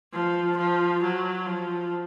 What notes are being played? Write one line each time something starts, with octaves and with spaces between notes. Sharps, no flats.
F3
F3
F#3
F3